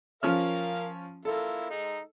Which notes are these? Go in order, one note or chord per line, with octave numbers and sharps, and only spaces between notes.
F3 C#4 A#4 F5 F6
A#3 E4 F4 A4
G#3 D#4